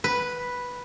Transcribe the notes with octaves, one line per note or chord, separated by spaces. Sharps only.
B4